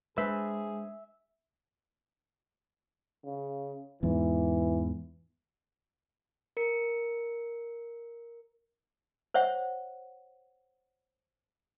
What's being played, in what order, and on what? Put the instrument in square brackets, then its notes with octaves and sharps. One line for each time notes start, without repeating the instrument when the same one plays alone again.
[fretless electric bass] G#3 [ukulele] D4 B4 C5 [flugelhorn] G#4 [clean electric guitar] E5
[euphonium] C#3
[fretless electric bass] E2 G#2 [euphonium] E3
[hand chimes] A#4 C#7
[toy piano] C5 C#5 E5 F#5